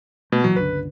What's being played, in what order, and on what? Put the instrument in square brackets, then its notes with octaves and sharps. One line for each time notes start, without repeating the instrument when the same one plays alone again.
[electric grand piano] B2 [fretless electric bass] A3
[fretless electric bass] A#2 E3 [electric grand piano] F#3
[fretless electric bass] G1 C#2 D3 [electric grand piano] B4